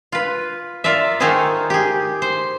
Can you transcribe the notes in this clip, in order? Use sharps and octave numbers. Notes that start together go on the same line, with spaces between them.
F4 B4
F4 A#4 D5 E5
D#3 A3 D#4 F4 G#4 C5
G4 G#4
C5